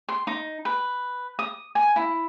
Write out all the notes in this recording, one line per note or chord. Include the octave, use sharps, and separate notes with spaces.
C6
D#4
B4
D#6
G#5
E4